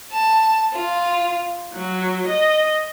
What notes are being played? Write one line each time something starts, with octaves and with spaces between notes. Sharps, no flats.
A5
F4
F#3
D#5